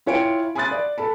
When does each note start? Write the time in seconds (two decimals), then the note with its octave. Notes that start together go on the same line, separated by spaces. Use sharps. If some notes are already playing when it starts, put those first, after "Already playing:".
0.06 E4 F4 C#5 G5 G#5 D7
0.55 G#5 B5 C6 D#6 F#6 A6
0.71 D5
0.98 A4 A5 B5